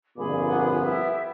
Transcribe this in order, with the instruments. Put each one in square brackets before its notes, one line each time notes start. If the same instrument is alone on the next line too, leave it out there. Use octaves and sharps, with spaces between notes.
[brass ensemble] G1 F2 A#2 [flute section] G#4 B5 D6
[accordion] B3
[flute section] E4 G4 E5